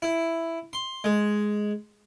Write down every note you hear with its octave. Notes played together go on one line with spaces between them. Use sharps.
E4
C6
G#3